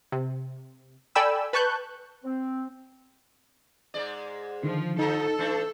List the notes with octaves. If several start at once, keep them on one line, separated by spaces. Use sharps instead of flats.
C3
A4 D5 G5 G#5 B5 E6
B4 A5 C#6 F#6 G6
C4
G#2 G#3 D5
D3 D#3 F3
D3 F3 D#4 A4
E3 A3 D4